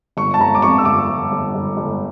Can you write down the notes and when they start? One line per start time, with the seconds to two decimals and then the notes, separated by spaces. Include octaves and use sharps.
0.17 G1 C#6
0.34 A5
0.40 G1 A#5
0.55 D6
0.62 F2 C#6
0.78 E6
0.85 G1 D6
1.09 G1
1.32 G1
1.55 G1
1.77 G1